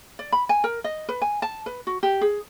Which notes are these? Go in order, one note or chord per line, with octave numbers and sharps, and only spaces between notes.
D5
B5
G#5
A#4
D#5
B4
G#5
A5
B4
F#4
G4
G#4